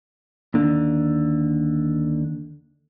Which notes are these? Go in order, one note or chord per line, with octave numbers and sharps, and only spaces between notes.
D#2 D3